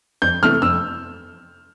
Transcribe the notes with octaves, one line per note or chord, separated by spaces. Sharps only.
F2 G6
C3 E3 A3 F6
F2 E6